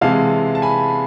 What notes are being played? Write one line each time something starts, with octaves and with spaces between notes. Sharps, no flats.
C3 E3 G#3 F5 A5
A5
G#5 B5